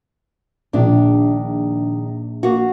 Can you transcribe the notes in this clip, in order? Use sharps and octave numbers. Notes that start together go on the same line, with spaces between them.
A#1 A#2 D#3 D4
A#3 F#4